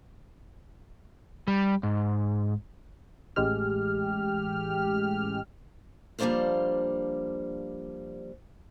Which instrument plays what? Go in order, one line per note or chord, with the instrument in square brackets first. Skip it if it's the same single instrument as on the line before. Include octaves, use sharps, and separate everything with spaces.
[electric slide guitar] G3
G#2
[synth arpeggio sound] A1 G#3 G4 F6
[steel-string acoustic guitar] F3 G3 A#3 D4 C5 F5